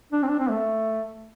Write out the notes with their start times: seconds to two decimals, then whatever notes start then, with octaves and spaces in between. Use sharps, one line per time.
0.13 D4
0.23 C4
0.28 D4
0.39 C4
0.49 A3